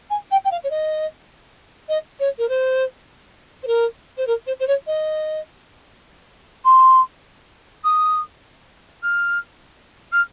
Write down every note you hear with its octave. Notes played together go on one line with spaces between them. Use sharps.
G#5
G5
G5
F5
C#5
D#5
D#5
C#5
A#4
C5
C5
A#4
C5
A#4
C5
C5
C#5
D#5
C6
D#6
F6
F6